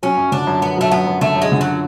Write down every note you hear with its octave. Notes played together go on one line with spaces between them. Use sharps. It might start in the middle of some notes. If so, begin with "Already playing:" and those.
F#3 C#4
F#2
D3 D4
F#2
F#2 B3
F#3 A3
F#2 B3
F#2
D3 A3
F#2
G#3
D3
F#3